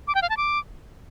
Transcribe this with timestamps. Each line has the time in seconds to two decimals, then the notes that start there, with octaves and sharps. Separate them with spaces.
0.07 D6
0.15 G5
0.22 F5
0.30 A5
0.37 D6